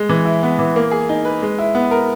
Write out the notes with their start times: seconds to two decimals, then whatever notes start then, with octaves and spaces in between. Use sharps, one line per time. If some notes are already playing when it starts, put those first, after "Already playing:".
Already playing: G#3
0.09 E3
0.25 E4
0.43 B3
0.59 E3
0.76 A#3
0.91 G#4
1.09 D#4
1.25 B4
1.42 G#3
1.59 E4
1.75 B3
1.91 A#4